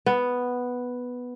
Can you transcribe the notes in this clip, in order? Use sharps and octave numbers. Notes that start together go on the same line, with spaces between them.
B3